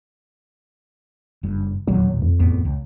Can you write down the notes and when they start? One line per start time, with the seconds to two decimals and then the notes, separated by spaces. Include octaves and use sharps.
1.43 F#1 G2
1.87 E1 A#1 D#2 F#3
2.22 F2
2.40 A1 E2 B3
2.65 C#2